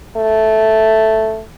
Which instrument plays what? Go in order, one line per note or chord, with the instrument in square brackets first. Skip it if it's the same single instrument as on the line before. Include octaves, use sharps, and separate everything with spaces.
[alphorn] A3